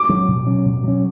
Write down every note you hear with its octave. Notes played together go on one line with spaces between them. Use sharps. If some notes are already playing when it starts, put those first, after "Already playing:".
Already playing: D6
F#3 C#4
B2
F#3 C#4
B2
F#3 C#4